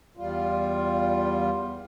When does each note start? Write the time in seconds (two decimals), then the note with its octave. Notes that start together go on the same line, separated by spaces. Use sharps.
0.17 E2 G3 F4